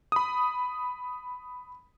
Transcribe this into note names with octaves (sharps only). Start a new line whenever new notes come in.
B5 D#6